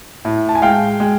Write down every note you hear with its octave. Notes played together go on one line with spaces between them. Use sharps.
A2
A5
G#5
G#3 F5 G5
G#3